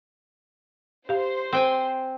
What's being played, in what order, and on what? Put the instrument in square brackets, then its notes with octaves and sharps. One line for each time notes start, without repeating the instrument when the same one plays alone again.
[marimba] G4 F5 [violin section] C5
[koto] C4 G5 G#5